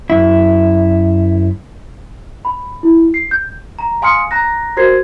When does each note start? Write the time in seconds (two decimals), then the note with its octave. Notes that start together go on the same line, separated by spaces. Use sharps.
0.10 F#2 E4
2.45 B5
2.83 E4
3.14 C7
3.31 G6
3.79 A#5
4.02 F5 G#5 C6 D#6 F6 C#7
4.31 A#5 F#6 A#6
4.77 F#4 A#4 C5 G#6 C7